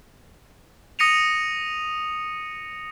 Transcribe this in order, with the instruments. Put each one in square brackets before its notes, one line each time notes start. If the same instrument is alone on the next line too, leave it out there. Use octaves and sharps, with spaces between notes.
[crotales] D#6 A#6 C#7 D#7 F7